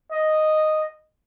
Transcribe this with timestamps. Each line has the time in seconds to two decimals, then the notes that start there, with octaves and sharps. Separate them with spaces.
0.12 D#5